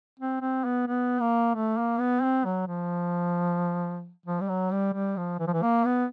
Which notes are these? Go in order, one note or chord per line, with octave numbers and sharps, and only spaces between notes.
C4
C4
B3
B3
A#3
A3
A#3
B3
C4
F#3
F3
F3
G3
F#3
G3
G3
F3
E3
F3
E3
A#3
B3